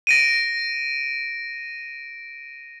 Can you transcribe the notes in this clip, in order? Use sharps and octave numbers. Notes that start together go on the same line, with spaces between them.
A#6 D7 D#7